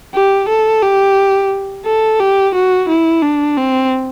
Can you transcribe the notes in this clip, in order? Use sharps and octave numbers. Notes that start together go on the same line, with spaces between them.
G4
A4
G4
A4
G4
F#4
E4
D4
C4